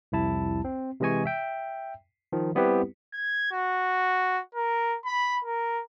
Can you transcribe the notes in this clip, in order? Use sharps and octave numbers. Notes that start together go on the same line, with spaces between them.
C2 F2 E4 A5
C4
C3 E3 G#3 D#5 G#5 C#6
E5 G5
D#3 F3
G3 B3 C4 E4 G4 B4
G#6
F#4
A#4
B5
A#4